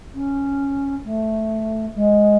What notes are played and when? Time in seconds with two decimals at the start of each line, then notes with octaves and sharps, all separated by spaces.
0.14 C#4
1.04 A3
1.95 G#3